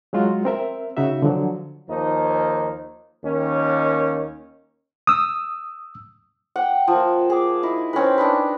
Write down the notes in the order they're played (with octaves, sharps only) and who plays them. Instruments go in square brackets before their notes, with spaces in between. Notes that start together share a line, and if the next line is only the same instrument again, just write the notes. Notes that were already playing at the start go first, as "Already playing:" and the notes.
[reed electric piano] F#3 G#3 F4 F#4
C4 A#4 E5
C#3 D#4 F#4 E5
D3 F3 F#3
[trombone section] D#2 F3 D#4
D#2 D#3 C#4
[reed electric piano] D#6 E6
[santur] F#5 G5
F3 A#3
G#4 D6
D#4 E4
C4 C#4 A#4 B4
D4 D#4 B4